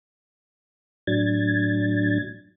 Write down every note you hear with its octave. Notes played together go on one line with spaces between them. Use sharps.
A2 F#3 D4 G#6 A6